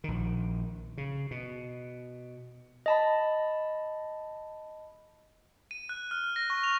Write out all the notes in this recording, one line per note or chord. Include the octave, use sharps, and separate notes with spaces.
A#1 D#3
C#3
B2
D#5 A5 B5
D#7
F#6
F6
A#6
C#6
F7